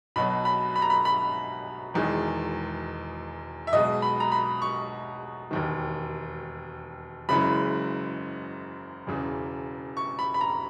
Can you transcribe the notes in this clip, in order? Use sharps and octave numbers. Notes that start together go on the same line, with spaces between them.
B1 B2 F#3 B5
B5
B5
A#5
B5
B5
E1 E2 D#3 G#3
E5
B1 B2 G#3 D#5
B5
A#5
B5
C#6
E1 D#2 D#3
F#1 F#2 C#3 E3 G#3 B5
E1 E2 C#3
C#6
B5
B5
A#5